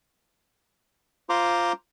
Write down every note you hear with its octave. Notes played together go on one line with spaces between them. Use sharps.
F4 C5 A#5 C6 D6